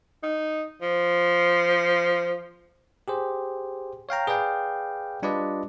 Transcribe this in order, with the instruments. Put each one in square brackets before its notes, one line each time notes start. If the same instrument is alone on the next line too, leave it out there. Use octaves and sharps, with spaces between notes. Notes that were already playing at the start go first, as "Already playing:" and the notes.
[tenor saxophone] D#4
F3
[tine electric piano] G4 G#4 C5
C#5 F5 G5 A#5
G#4 B4 D5 F5 G5
G3 D4 F4 B4 D5 D#5